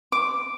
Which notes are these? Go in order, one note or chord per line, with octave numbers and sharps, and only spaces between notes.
D6